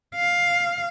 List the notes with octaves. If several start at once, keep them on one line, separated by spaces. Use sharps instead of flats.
F5